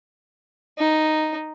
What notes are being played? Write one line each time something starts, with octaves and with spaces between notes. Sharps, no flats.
D#4